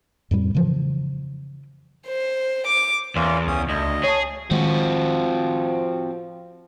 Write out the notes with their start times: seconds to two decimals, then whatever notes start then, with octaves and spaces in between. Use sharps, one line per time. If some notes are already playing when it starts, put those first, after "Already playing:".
0.31 F2 A2 G3
0.55 C#3 E3 F3
2.07 C5
2.67 D6
3.16 E2 A#3 C#4 F4
3.47 C#2 C#4 D#6
3.69 D2 D#5
4.04 G#4 C#5 A5
4.51 D#3 F3 G#3 C4 F#4